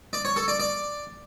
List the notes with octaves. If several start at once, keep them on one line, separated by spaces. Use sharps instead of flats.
D5
C#5
A4
D5
D5